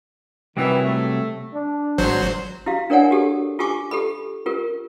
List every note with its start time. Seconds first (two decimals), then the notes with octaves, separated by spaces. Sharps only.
0.57 C3 D#3 E3 F#3 G3
0.84 A3
1.54 D4
1.98 G#1 F#3 C5
2.66 E4 F#4 G4 F5
2.90 D4 A#4 C#5 D5 F#5 G#5
3.11 F#4 G4 A4
3.59 F4 G4 G#5 C#6 D6
3.91 G4 A4 B5
4.46 F4 G4 A#4